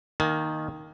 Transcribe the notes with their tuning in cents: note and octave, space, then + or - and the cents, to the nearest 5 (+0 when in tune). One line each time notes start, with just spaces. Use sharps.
D#3 +0 A#3 +0 G#5 +45